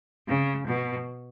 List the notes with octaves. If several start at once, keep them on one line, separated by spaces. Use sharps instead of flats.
C#3
B2